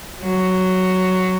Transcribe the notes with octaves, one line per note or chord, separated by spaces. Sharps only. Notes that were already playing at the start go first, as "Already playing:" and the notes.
F#3